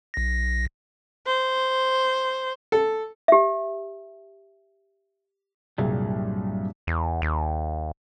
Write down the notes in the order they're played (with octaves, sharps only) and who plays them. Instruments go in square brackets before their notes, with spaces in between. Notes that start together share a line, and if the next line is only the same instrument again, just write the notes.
[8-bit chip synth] B1 A#6
[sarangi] C5
[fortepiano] A4
[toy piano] G4 E5
[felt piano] C2 A#2 G#4 [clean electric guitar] G2 F#3 G3
[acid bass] E2
D#2